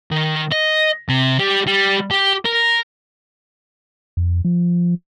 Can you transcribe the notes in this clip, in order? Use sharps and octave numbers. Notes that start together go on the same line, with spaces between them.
D#3
D#5
C3
G3
G3
G4
A#4
F2
F3